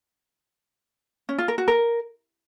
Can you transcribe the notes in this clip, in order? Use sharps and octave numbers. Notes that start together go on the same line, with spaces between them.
C#4
F4
A#4
F#4
A#4